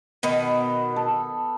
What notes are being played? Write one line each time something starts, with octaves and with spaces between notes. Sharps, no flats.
B2 D#3 B3
A4